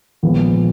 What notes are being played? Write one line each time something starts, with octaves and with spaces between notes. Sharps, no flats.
A#1 A#2 F3 G#3 B3